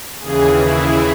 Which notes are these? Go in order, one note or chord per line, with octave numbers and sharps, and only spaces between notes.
D#2 C#3 E3 G#4
E4